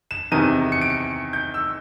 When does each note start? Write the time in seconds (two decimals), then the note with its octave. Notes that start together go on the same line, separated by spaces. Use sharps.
0.11 E7
0.32 E2 C3 D#3 D#7
0.72 C#7
0.81 D7
0.90 C#7
1.33 G6
1.54 E6